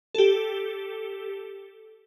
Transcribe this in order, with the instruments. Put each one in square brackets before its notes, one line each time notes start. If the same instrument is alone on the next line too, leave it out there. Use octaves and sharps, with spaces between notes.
[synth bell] G4 A4